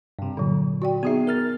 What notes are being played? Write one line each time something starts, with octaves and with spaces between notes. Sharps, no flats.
G2 C3
A#2 D3 F#3
F#4 D5 G5
B3 D#4 F#4 G#4 E5
A#4 F6 A6